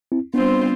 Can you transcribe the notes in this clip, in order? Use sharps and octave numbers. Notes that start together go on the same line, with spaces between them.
C4 E4
G3 B3 C4 D4 F4 C5